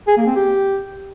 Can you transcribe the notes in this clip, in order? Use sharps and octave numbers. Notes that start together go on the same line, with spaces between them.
G#4
A#3
C4
G4